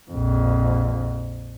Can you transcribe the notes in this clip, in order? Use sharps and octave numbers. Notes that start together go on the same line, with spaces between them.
A#1 F2